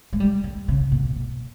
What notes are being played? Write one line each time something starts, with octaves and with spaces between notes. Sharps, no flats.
G#3
G3
D#3
C#3
B2
A#2